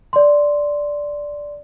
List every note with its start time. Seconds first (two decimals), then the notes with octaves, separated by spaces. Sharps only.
0.13 D5 C6